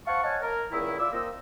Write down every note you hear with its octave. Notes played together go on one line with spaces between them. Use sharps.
C5 F5 F#5 A5 C#6
C#5 D#5 F5 F#5 G#5 A5
A#4
C#2 A#2 D#3 E4
F4 D5 E5 D6 E6
F3 A#3 C4 D#4 E6